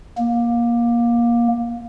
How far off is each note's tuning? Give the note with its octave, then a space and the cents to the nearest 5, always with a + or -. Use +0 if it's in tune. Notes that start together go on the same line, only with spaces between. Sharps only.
A#3 +20